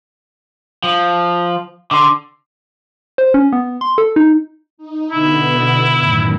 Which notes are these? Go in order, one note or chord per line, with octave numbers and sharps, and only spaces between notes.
F3
D3 C6 D6
C5
C#4
B3
C6
A4
D#4
D#4
B2 D3 B3 E4
F#2 A2 D#3